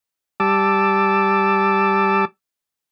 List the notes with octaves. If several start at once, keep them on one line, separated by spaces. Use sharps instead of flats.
G3 A5 D6 E6